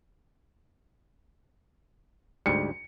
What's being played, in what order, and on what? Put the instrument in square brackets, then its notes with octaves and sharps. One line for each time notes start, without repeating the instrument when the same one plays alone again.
[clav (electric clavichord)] D2 G#2 G3 [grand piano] C#7